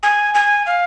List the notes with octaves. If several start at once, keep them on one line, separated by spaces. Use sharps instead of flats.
G#5
G#5
F5